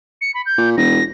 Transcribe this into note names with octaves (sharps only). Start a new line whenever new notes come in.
C#7
B5
G6
A#2
E1 A#6